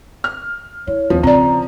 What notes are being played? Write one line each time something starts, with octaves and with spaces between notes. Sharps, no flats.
F6
E4 C#5
D#2 F3
C#3 C4 D5 A#5